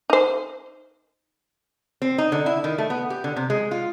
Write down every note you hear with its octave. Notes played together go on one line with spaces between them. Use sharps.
D#4 C5
C4
D#4
D3
E4
D#3
A3
B3
G4
D3
C3
G#3
F4